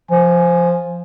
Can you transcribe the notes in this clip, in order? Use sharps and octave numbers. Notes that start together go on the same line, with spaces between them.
F3 G#5